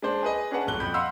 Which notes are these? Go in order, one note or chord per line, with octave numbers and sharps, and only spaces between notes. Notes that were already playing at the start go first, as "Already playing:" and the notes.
G#3 D4 C5 A5
G#4 B4 D#5
C#4 D4 G#4 B4 F#5 A5
D#1 B1 F#6 G7
F2 B5 G6
D#5 F5 F#5 B5 C6 E6